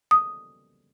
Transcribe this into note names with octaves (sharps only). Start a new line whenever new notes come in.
D#6